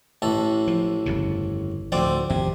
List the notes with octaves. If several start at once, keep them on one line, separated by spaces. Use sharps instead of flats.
A1 A2 A4
F3
G1 F2 C#3
D2 A2 F3 C4 D5
G#1 F2 A2 C3